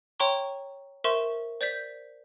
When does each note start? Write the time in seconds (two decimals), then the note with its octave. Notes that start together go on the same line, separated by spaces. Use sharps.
0.20 C#5 G5 A#5 C6 C#6
1.04 A#4 C5 E5 C6 C#6 E7
1.61 C5 D5 G6 B6